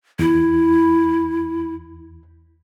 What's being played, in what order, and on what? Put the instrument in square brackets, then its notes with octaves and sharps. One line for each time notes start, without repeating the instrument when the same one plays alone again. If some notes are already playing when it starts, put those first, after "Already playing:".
[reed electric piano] E2 [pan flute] E4